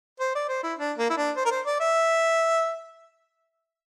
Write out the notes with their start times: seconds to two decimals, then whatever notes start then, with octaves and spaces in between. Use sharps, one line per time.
0.20 C5
0.35 D5
0.49 C5
0.64 E4
0.79 D4
0.98 A#3
1.10 E4
1.17 D4
1.37 C5
1.46 A#4
1.51 C5
1.66 D5
1.80 E5